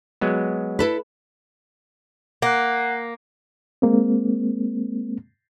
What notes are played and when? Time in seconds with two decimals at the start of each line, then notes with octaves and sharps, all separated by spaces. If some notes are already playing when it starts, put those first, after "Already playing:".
0.21 F#3 G#3 B3
0.79 E4 A4 B4
2.42 A#3 F#5 F#6
3.82 G#3 A#3 C4